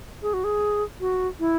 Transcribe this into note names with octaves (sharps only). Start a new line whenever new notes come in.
G#4
F#4
G#4
F#4
E4